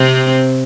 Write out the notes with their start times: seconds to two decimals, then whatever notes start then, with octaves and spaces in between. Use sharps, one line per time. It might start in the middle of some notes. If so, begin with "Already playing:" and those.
Already playing: C3 C4